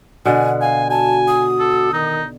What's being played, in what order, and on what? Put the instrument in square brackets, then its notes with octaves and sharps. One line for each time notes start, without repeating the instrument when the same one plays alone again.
[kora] B2 D3 [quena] G#5
[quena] F5 [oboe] G#5
[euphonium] F#4 [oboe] G#5 [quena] A5
[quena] D#6
[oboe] A4
[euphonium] D#3 [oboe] D#4